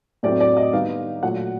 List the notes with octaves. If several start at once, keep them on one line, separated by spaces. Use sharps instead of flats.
A2 F#3 A3 C4 D5
D5
D#5
D#3 G3 B3 D#4 F5
A#2 F#3 A3 F#5